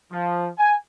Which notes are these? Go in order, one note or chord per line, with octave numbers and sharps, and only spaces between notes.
F3
G#5